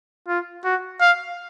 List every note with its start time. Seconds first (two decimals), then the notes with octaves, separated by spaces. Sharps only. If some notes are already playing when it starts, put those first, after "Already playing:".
0.28 F4
0.64 F#4
1.00 F5